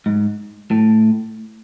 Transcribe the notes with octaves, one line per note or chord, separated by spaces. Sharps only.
G#2
A2